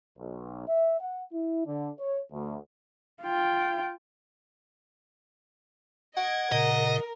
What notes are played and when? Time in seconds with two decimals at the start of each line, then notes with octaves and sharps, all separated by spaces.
0.18 B1
0.67 E5
1.00 F#5
1.33 E4
1.67 D3
1.99 C#5
2.32 D2
3.23 F4 G5
6.17 D#5 F#5 G#6 D7
6.52 A#2 C#3 A#4 D#5